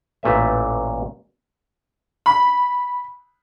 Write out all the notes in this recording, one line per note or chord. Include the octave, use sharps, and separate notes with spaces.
A1 A#2 A3 B4 E5
B5